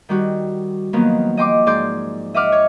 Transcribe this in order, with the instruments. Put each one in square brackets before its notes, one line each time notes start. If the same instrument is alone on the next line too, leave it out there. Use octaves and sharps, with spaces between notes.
[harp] D#3 G3 F#4
D#3 F3 F#3 A#3 B3
D#5 G5 C6 D6
G#2 G#4 D5 C6 G6
D#5 E5 F#5 D6 F6
C#5